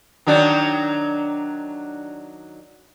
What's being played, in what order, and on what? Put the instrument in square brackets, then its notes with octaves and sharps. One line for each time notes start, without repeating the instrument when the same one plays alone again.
[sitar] D#3 F#3 D4